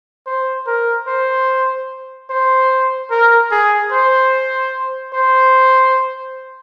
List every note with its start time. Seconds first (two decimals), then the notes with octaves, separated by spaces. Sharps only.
0.27 C5
0.67 A#4
1.08 C5
2.30 C5
3.11 A#4
3.51 G#4
3.92 C5
5.14 C5